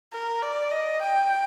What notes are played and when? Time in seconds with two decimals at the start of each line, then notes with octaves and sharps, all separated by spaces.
0.13 A#4
0.42 D5
0.71 D#5
1.02 G5